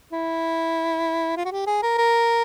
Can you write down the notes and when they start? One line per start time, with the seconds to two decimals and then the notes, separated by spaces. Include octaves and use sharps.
0.12 E4
1.37 F4
1.45 F#4
1.52 G4
1.67 G#4
1.83 A#4
1.98 A#4